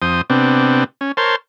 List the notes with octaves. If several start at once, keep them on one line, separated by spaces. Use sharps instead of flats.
F2 C5 D#6
C3 B3 C4 D4
C#4
A#4 C5 C#5 A5 C6